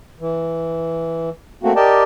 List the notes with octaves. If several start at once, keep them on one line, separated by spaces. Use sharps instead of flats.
E3
A3 A#3 C4 F#4
G4 A#4 D5 D#5 G5 A5